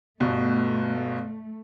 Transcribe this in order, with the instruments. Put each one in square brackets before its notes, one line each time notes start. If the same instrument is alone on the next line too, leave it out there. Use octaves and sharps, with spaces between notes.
[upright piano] G1 B2 [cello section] A3